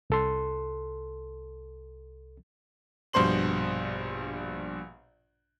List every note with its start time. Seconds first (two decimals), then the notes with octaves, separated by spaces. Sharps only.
0.10 C2 A4 C6
3.13 A#1 G2 B2 C5 C6 F#7